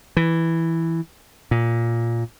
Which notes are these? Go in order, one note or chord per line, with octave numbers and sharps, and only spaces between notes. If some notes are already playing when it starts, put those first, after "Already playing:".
E3
A#2